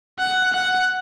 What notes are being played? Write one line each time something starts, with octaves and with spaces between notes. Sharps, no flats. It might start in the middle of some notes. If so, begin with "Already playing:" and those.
F#5
F#5